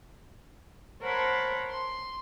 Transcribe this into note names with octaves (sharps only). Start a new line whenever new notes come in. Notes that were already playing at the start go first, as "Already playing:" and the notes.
A#4 C5 C#5 F#5 A5 B5
C6